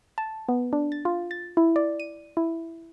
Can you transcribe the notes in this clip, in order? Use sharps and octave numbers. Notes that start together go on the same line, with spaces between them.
A5
B3
D4
A6
F4
A6
E4
D5
D#7
E4